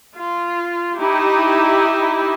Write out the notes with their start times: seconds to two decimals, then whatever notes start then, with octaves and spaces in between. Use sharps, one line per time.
0.17 F4
0.98 D#4 E4 G4